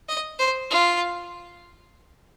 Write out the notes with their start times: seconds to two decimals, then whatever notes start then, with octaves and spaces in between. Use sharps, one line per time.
0.09 D#5
0.39 C5
0.71 F4